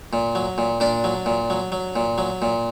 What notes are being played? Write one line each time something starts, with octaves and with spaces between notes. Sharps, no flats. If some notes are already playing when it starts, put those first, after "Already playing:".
A#2
F#3
A#2
A#2 D4
F#3
A#2
F#3
F#3
A#2
F#3
A#2